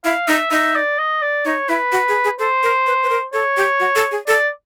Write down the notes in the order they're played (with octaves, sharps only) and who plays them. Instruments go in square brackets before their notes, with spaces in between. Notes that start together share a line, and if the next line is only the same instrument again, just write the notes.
[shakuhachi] E4 [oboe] F5
[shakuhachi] D#4 [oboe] E5
[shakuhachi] D#4 [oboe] E5
[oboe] D5
D#5
D5
[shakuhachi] D#4 [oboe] C#5
[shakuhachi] E4 [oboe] B4
[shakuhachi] F#4
G#4
G#4
[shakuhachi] A4 [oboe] C5
[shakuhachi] A#4
B4
B4
A#4
[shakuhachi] A4 [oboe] C#5
[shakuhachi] G4
F#4
A4
G#4
[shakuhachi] A4 [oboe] D5